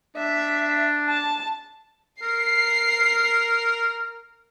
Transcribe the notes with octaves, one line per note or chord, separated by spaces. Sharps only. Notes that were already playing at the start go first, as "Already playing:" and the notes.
D4 E5
A5
A#4 C7